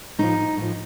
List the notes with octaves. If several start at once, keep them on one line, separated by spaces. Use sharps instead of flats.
A2 F3 D#4
A2 F3